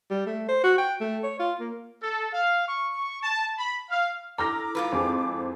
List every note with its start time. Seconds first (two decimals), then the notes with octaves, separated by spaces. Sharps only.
0.10 G3
0.26 A3
0.49 C5
0.64 F#4
0.78 G5
1.01 A3
1.24 C#5
1.39 F4
1.60 A#3
2.03 A4
2.32 F5
2.67 C#6
3.22 A5
3.57 B5
3.90 F5
4.38 E4 A4 A#5 D6 F6 A#6
4.75 G#2 F4 B4
4.92 F2 C4 G#4